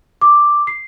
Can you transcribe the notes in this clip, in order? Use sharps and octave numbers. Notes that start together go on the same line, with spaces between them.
D6
C7